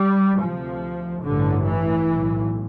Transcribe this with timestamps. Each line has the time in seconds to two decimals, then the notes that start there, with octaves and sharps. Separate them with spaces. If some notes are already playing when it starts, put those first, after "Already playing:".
Already playing: G3
0.39 D2 C3 F3
1.23 A1 G2 D3
1.64 E3
2.06 B1 A2